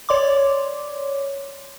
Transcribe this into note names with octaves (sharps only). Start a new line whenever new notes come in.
C#5 D5 C6 D6